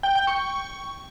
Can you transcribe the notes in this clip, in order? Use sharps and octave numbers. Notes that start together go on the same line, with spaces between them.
G5
G5
C#6